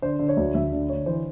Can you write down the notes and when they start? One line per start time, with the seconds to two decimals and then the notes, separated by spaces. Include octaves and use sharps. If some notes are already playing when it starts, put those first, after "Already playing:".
0.02 D3 C5
0.19 D3
0.29 C#5
0.37 D2
0.55 D2 E5
0.72 D3
0.89 D3 C#5
1.06 E3 C5